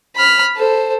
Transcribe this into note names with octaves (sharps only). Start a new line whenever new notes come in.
B5 F6
A4 C5